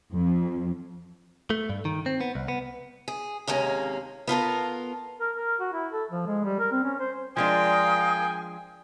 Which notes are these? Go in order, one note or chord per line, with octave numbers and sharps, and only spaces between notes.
F2
A3
G2
D#3
C4
B3
C2
B3
G#4
D#2 C3 G#3 A#3 C#4
B3 F4 A4 A#4
A#4
A#4
F#4
E4
A4
F3
G#3
G3
A#4
C4
C#4
C5
F3 G#3 D4 A#4 F5 G5 G#5 D#6